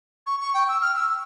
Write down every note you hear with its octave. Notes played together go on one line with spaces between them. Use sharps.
C#6
C#6
G5
E6
F6
E6